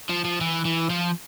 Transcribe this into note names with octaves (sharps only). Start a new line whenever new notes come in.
F3
F3
E3
E3
F3